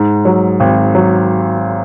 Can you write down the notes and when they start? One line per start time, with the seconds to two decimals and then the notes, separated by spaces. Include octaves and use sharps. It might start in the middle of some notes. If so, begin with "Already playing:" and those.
Already playing: G#2
0.25 F#3
0.60 G#1
0.95 F#3